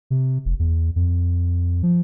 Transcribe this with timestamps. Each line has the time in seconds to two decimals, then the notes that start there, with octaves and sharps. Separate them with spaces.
0.10 C3
0.45 F1
0.59 E2
0.96 F2
1.83 F3